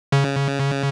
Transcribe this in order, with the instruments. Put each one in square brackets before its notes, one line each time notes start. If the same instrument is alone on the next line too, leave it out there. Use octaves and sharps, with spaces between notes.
[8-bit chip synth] C#3